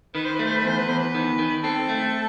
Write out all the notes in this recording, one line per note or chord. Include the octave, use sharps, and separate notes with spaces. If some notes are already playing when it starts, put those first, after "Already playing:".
D#3 B4
C5
A3 B4
C5
B4
E2 C5
B4
E2 C5
B4
D#3
D#3
C4 A4
A3